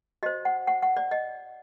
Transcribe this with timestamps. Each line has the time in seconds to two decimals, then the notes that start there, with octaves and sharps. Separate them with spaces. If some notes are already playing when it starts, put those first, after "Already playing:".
0.23 F#4 C5 D#5
0.45 F#5
0.67 F#5
0.82 F#5
0.97 D5
1.11 D#5